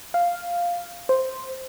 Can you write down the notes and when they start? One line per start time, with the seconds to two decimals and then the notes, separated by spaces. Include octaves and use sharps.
0.14 F5
1.09 C5